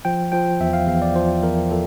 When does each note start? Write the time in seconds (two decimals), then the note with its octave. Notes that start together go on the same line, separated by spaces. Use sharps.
0.05 F3 G5
0.32 F3 G5
0.60 E2 E5
0.73 F5
0.87 E2 F5
1.02 D5
1.16 F3 C5
1.43 E2 A#4
1.71 F3 A4